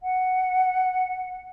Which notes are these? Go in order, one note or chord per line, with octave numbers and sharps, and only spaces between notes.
F#5